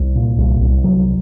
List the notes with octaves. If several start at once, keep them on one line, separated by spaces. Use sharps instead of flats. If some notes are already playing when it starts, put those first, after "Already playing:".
Already playing: C2
A#2
C2
C2
F#3